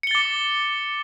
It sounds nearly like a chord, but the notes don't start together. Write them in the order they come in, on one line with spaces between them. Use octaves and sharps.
C#7 G7 A6 D6